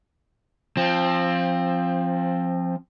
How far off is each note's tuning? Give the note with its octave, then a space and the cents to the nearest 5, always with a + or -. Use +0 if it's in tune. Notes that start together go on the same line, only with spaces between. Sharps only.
F3 +0 C4 +20